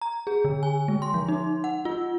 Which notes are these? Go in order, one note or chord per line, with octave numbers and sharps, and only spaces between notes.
A#5
G#4
D3
G#5
G#3
C6
F3
D#4
F#5
F4